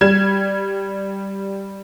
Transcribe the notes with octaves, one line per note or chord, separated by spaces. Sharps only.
G3 G#6 E7